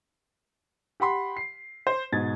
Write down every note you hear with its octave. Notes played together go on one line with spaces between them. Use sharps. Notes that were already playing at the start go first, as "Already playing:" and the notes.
G4 F#5 B5 C6
C7
C5
G#2 B2 G#6 A6